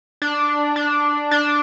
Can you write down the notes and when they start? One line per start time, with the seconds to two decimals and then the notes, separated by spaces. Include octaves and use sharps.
0.22 D4
0.76 D4
1.31 D4